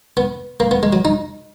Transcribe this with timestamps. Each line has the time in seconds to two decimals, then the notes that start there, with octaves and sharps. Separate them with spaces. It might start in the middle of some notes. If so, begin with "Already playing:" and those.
0.17 B3
0.60 A#3
0.71 B3
0.83 G#3
0.93 F#3
1.05 D#4